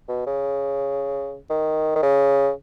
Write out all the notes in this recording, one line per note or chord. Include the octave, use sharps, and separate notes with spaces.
B2
C#3
D#3
D#3
C#3